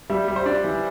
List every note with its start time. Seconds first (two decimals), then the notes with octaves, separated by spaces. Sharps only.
0.10 G3 E5
0.28 G3
0.36 C5
0.46 D4 D5
0.64 E3